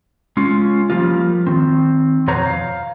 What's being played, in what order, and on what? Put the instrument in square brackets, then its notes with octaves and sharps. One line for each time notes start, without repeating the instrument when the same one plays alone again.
[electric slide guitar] G#3 C#4 F4
F3 G3 A#3 F4
D#3 C4
F2 B2 B3 C5 C#5 A#5
F5